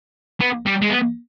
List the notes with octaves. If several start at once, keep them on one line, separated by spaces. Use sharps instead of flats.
B3
G3
G#3
B3